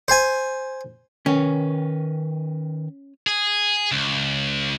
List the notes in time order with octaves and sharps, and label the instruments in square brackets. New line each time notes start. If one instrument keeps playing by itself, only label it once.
[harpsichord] C5 G#5
[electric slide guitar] D#3 A#4 B4 [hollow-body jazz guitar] C#4
[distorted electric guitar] G#4
C#2